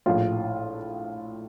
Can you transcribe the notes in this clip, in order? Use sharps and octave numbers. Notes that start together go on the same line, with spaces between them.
A#1 A2 F3 F4